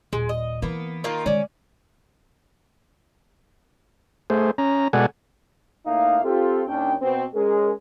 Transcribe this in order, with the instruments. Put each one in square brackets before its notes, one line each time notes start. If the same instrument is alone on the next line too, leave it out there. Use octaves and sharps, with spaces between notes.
[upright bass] D#1 [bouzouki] G#3
[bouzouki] D#5
[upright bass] E3 [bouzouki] A#3 B3
[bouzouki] D#3 A#3 F4
[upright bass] D#3 G#3 [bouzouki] C#4 D5
[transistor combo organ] A3 G#4 C5
C#4 A#5
B2 G#3 A4 D5 F#5 G#5
[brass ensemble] A2 A#3 D#4 E5 F5
C4 F4 G4 A4
D#2 C#4 D4 G5
B2 C4
G#3 C#4 G#4 A#4